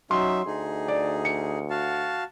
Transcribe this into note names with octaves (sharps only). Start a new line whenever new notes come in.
F#3 C#4 D#4 E5 C6
D2 D#4 G#4
D5
C#7
F#4 F5 A5